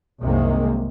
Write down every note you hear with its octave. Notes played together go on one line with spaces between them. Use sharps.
C2 F#2 C3 D#3 G#3 A#3